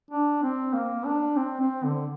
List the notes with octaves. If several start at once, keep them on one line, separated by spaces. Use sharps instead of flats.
D4
C4
A#3
D4
C4
C4
D3